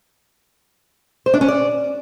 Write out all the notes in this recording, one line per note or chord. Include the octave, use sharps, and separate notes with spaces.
C5
D4
C#4
D5